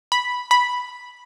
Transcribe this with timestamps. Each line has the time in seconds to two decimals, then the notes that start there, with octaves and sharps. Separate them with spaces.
0.12 B5
0.51 B5